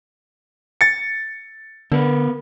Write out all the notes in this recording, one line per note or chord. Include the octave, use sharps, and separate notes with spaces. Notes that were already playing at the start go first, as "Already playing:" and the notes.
A6 C#7
D3 B3 A#4 B4